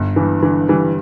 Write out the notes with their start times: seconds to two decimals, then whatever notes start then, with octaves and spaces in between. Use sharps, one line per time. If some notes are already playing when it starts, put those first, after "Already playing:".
Already playing: G1
0.16 G2 E3
0.43 D3 E3
0.68 E3 G3